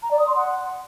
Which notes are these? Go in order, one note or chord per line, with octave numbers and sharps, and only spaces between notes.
A#5
D5
D#6
C6
F#5